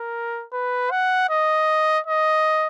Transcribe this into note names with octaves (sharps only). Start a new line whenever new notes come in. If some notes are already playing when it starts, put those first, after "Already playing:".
Already playing: A#4
B4
F#5
D#5
D#5